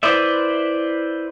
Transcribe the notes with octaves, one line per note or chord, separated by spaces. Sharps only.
E4 B4 C5 D5 E5